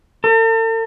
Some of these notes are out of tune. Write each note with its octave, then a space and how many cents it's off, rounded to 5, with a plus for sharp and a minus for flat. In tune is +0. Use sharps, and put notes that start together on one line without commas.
A4 +45